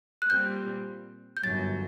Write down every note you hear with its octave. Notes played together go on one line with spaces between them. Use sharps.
F#6
A#2 G3 C4 G6
G6
G1 F#2 F#3 A6